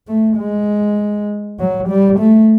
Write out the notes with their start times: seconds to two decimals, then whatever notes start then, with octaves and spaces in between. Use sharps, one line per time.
0.08 A3
0.38 G#3
1.59 F#3
1.89 G3
2.19 A3